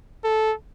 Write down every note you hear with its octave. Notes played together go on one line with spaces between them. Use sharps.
A4